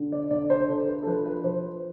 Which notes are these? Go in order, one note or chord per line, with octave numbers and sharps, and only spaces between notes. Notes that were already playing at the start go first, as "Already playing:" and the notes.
Already playing: D3
D5
D3 D5
C5
D3 A4
B4
A4
F3 B4
B4
F3 C5